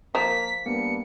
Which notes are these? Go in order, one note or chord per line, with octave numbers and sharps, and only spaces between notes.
F3 A#3 A#4 C5 B6
G2 A#3 B3 C#7